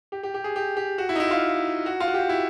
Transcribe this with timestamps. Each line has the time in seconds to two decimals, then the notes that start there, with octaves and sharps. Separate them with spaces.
0.12 G4
0.23 G4
0.34 G4
0.44 G#4
0.56 G4
0.77 G4
0.98 F#4
1.09 E4
1.15 D#4
1.20 E4
1.31 F4
1.86 F#4
2.00 F4
2.08 F#4
2.14 G4
2.29 E4